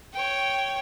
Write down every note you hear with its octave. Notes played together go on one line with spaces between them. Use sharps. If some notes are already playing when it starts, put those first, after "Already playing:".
C#5 G5